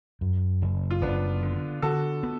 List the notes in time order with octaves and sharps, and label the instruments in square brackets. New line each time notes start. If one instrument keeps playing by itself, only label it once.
[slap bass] F#2
F#1
[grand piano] F4
[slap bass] F#1 [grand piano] B3 D4
[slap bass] D3
[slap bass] D3 [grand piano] F#4 A4
[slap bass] B3